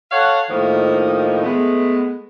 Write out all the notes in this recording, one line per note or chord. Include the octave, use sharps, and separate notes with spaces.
A4 C#5 F5 F#5
A2 D#3 F3 A#3 D#4
G#3 A3 B3